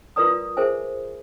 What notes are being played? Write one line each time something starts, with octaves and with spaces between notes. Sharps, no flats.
F4 A#4 B4 D5 A#5 D#6
F4
G#4 A#4 C5 E5 G#5